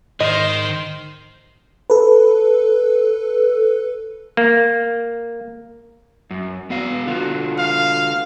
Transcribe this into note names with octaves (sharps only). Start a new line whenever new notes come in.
G#2 D#3 C5 D#5
A4 B4
A#3
F#2
B3 F#4 F5
D3 F4 F#4
F5